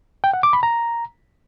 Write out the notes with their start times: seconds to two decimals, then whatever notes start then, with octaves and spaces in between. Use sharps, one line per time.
0.24 G5
0.33 F#5
0.43 D6
0.53 B5
0.63 A#5